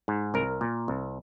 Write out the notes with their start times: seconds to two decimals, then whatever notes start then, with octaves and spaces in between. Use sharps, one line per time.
0.08 G#2
0.34 C2 A#4
0.61 A#2
0.88 C2